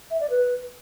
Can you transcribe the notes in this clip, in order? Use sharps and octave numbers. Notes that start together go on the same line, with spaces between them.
E5
D5
B4